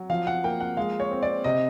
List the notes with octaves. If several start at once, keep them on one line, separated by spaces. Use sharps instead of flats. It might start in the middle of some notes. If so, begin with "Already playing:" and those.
Already playing: F#3
F3 F5
F#5
A#3 G5
F#5
G#3 F5
C#5
C4
D5
C3 D#5